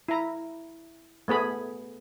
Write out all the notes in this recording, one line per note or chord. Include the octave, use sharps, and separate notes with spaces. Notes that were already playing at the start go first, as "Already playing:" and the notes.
E4 A#5
A3 B3 G#4 B5